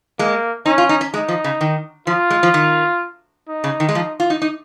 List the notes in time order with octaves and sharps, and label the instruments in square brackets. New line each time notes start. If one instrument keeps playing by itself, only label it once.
[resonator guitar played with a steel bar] G#3 [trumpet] A#3
[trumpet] C#4 [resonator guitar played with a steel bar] D#4
[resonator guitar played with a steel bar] F4
D#4
C#4
[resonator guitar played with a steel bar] G#3 [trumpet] D#4
[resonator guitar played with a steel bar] F3
C#3
D#3
[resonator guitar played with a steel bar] F3 [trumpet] F4
[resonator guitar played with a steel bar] G#3
F3
D#3
[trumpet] D#4
[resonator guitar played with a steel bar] C#3
D#3
G#3
F3
F4
D#4
D#4